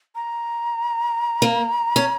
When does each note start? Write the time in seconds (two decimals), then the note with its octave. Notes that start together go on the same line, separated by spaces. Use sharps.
0.15 A#5
1.42 A#3
1.96 C#4